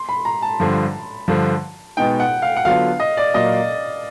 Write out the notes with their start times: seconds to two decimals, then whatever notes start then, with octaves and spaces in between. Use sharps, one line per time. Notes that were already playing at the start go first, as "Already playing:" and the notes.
Already playing: C6
0.09 B5
0.25 A#5
0.42 A5
0.60 G2 D3 F3
1.28 G2 D3 F3
1.97 B2 G#3 B3 D#4 G5
2.20 F#5
2.42 F5
2.57 F#5
2.65 D3 F#3 B3 D4 F4 F5
3.00 D#5
3.17 D5
3.34 A#2 F#3 A#3 D#5